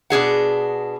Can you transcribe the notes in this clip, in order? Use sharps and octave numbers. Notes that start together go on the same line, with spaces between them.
B2 D4 G#4 F#5